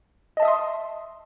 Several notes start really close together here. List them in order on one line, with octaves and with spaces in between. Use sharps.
D#5 A5 E5 D#6 C6